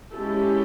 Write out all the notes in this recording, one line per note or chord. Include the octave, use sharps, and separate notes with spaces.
G#3 C#4 E4 G4 A4